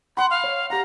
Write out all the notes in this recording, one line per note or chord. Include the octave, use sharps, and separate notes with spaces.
F#5 B5 C6
F5
C#5
G4 F#5 A#5